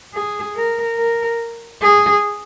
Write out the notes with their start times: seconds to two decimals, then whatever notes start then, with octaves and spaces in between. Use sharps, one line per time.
0.14 G#4
0.56 A#4
0.98 A#4
1.82 G#4